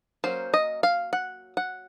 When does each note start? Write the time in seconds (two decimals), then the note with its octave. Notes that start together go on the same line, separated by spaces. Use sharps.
0.24 F#3 A#3 C#4 C5
0.54 D#5
0.83 F5
1.13 F#5
1.57 F#5